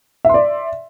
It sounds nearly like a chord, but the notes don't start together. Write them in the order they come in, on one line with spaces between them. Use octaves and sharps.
E5 C6 D5